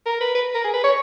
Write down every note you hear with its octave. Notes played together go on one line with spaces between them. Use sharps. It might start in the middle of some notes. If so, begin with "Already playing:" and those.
A#4
B4
B4
A#4
G#4
B4
C#5